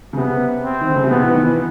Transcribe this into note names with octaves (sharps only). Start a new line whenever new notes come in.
C#3
C3 B3
C4
D#3
D3
C#3
C3
B2 B3
E3
D#3
E3